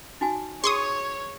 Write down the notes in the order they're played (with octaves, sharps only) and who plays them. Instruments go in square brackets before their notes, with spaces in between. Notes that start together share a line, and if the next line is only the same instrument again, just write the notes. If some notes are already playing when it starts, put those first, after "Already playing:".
[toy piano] D#4 F#4 G#5
[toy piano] G#4 [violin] C#5 [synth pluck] C6 C#6 D#6